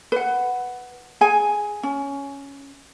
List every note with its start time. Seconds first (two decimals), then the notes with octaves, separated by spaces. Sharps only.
0.12 B4 F#5
1.21 G#4 G#5
1.83 C#4